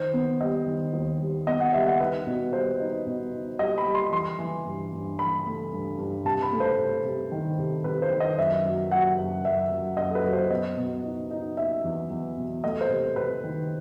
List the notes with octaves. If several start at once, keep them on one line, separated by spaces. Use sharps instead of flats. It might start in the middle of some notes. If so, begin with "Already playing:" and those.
Already playing: D#3 C5
B3
G3 D#5
D#3
D#2
G3
B3 D#5
F#5
G3 E5
F#5
D#4 B4
B2
G3 C5
D#4
B2
D#4
G3 D#5
B5
G3
C6
E3 C6
E3
G2
G2
E3 B5
A3
G2
G2
C3 A5
B5
A3
C5
C3
C3
D#3
C3
C3 B4
C5
D#3
D#5
F#2 E5
F#3
F#3 F#5
F#2
F#2 E5
F#2
F#2 D#5
A4
B4
F#3
C5
B2 D#5
B2
D#4
D#4
D#4 E5
E2
E2
B2
A3 D#5
C5
C3
C3 B4
D#3